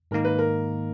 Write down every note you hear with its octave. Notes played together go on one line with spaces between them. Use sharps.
G#2 D#3 A#3 D#4 A#4
B4
A#4